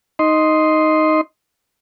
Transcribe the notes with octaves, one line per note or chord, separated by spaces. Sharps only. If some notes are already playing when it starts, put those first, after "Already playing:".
D#4 D#5 C6